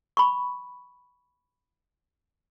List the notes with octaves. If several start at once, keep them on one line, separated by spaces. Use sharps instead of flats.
B5 C#6